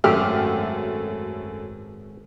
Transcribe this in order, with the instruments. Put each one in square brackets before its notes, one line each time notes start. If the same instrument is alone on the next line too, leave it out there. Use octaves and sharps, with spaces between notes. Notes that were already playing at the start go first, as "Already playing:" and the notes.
[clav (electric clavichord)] G#1 G4 E5 [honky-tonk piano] F#2 A3 F6